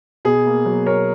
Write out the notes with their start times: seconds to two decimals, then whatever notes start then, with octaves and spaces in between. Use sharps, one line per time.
0.25 B2 G#4
0.46 A#3
0.66 F#3
0.86 B2 A#4 C#5